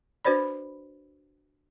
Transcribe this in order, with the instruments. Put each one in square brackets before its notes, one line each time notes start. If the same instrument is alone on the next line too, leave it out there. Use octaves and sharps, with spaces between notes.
[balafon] D4 F#4 B4 C5 D5 B5